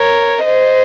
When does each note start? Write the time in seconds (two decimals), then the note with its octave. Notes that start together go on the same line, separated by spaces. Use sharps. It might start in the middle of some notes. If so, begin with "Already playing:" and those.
Already playing: A#4 C#5
0.44 C5 D#5